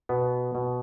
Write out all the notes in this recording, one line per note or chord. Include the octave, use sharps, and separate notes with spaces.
B2 B3
B2